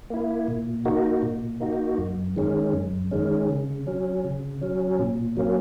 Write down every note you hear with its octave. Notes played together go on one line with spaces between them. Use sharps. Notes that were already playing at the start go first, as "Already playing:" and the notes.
A#3 E4
A#2
A#3 D#4 F#4
A#2
A#3 D#4 F#4
F#2
D#3 G#3 C#4
F#2
D#3 G#3 C#4
C#3
F#3 C#4
C#3
F#3 C#4
A#2
F#3 A#3 C#4